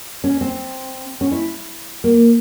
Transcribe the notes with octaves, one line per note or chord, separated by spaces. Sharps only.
C#4
C4
C#4
E4
A#3